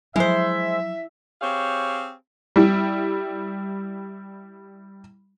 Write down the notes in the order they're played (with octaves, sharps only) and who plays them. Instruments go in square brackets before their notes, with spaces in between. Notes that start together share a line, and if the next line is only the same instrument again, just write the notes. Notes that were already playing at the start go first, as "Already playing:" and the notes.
[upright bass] F3 F#3 [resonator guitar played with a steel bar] G#3 C5 [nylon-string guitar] E4 [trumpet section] E5
[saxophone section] C4 G4 G#4 C#5 F5
[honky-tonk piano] G3 E4